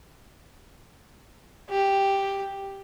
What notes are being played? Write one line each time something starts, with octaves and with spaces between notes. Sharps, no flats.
G4